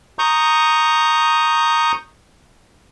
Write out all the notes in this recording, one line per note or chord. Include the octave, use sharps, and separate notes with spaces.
A#5 C#6 D#6 G6